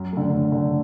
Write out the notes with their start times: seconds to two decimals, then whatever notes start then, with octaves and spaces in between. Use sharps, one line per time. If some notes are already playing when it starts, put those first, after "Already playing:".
Already playing: F#2
0.13 D3 A3
0.32 F#2
0.52 D3 A3